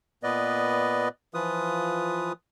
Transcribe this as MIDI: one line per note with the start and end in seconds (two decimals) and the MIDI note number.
0.23 1.08 46
0.23 1.08 59
0.23 1.08 71
0.23 1.08 74
0.23 1.08 75
1.34 2.32 52
1.34 2.32 53
1.34 2.32 65
1.34 2.32 71
1.34 2.32 87